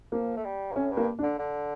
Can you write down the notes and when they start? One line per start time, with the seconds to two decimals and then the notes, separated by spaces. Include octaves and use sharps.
0.12 F3 A#3
0.37 A3
0.44 G3
0.71 G2
0.75 A2 C#4
0.91 G2
0.97 A#3
1.19 D4
1.23 D3
1.39 D3